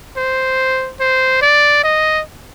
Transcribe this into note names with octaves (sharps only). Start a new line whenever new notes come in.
C5
C5
D5
D#5